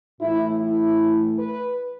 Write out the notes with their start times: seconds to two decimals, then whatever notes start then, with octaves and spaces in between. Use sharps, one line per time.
0.21 A2 E3 A3 E4
0.60 E4
1.39 B4